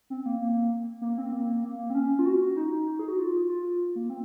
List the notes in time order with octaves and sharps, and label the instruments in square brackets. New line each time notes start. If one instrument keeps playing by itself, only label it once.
[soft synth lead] C4
A#3
A#3
A#3
C4
A#3
A#3
C4
C#4
F4
F#4
D#4
G#4
F#4
F4
F4
A#3
C4